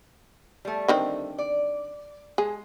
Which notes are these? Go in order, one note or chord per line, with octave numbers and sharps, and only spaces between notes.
G3 A3
D3 D#3 C4
D5
G#3 G#4